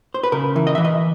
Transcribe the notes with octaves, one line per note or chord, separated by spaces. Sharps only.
C5
B4
C#3 A#4
E3
D#5
E3 E5
D#5